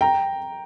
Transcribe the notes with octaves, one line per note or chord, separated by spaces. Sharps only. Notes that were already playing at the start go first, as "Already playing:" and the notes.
G5 A#5